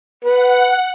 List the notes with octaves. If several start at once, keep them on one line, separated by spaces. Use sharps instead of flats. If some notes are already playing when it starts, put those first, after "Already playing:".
B4 F#5